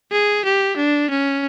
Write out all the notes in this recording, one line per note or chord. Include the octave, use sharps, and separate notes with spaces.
G#4
G4
D4
C#4